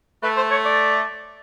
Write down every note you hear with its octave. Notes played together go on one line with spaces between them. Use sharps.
A3 B4
C5
C#5
D5